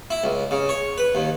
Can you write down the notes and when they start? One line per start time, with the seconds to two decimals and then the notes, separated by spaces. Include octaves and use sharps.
0.10 E4
0.24 C#2
0.51 C#3
0.69 C#5
0.98 B4
1.15 D#2